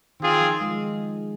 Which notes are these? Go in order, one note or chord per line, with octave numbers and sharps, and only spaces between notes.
D#3 C4 F4 G#4
F3
G#3